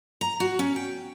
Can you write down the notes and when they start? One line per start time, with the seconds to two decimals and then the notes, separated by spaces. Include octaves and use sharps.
0.21 A#5
0.40 F#4
0.59 C#4
0.76 G5